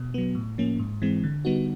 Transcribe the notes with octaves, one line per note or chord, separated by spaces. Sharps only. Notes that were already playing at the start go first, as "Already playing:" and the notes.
Already playing: B2
F#3 B3
A2
F3 A#3 C#4
G#2
E3 G#3 C4
D3
G3 B3 D#4 F#4